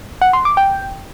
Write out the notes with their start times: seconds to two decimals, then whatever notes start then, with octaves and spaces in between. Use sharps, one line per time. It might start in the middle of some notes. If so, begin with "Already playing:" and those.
0.22 F#5
0.33 C6
0.45 D6
0.57 G5